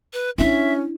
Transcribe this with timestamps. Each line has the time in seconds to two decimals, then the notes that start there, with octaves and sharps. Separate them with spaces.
0.13 B4
0.38 C#4 D4 E4 E5